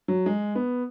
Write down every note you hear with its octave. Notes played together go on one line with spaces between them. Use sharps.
F#3
G#3
B3